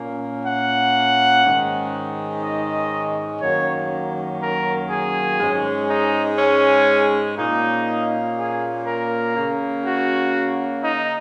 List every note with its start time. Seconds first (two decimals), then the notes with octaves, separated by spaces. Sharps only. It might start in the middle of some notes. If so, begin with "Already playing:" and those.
Already playing: A#2 A#3 C#4
0.45 F#5
1.44 G#2 D#3 G#3 C#4
2.43 D#5
3.41 F#2 D#3 F#3 A#3 C#4 C#5
4.40 A#4
4.90 G#4
5.40 G#2 G#3 C#4
5.88 D#4
6.38 C#4
7.37 A#2 A#3 C#4 D#4
8.36 G#4
8.85 A#4
9.35 C#3 A#3 C#4
9.84 F#4
10.83 D#4